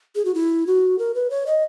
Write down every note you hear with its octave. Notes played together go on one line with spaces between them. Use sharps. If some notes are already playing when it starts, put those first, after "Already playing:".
G#4
F#4
E4
F#4
A#4
B4
C#5
D#5